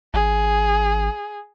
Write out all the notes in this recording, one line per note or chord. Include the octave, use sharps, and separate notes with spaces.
G#1 G#4